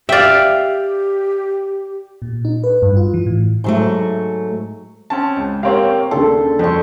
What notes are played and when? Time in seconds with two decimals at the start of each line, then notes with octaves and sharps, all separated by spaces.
0.09 G4 D5 E5 F5 G5
2.22 A#2
2.45 D#4
2.64 B4
2.82 G2
2.97 F4
3.14 E3
3.26 A2
3.64 G#2 F#3 A3
5.10 C4 C#4 A5
5.36 C#2
5.63 A#3 C4 G4 C#5 F5
6.11 D#2 C#3 D4 A4 C6
6.59 F2 C5 C#6